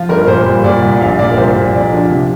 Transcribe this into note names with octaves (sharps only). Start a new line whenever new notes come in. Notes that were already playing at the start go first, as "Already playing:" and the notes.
Already playing: F3 F4
G1 A#4
A#2 C5
G3
A#2 D5
C2
A#1 F5
A#2 D5
A#4
C2 C5
A#2
F2 D5
F3 D4
C3